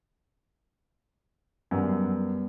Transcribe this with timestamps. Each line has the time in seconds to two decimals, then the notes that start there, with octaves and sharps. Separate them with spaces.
1.71 F#2 G3 B3